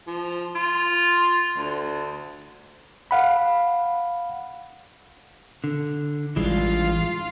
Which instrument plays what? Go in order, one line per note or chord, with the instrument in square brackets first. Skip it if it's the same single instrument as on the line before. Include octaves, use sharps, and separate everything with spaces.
[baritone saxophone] F3
F4
D2
[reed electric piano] F5 F#5 B5
[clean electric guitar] D3
[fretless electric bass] A1 G3 [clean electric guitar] E3 G#3 D4 [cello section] F4 F5